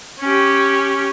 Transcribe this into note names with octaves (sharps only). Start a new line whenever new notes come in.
C#4 G4